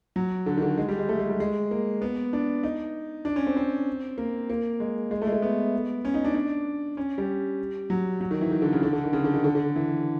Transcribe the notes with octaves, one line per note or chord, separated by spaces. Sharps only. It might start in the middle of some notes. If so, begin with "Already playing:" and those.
F#3
D3
D#3
D3
G#3
G3
G#3
A3
G#3
G3
G#3
A#3
B3
D4
D#4
D4
C#4
C4
C4
A#3
A#3
G#3
G#3
A3
G#3
A3
B3
C#4
D#4
D4
D4
C#4
G3
F#3
F#3
D#3
E3
D#3
D3
C#3
D3
D3
D#3
C#3
D3
D#3
D3
D3
E3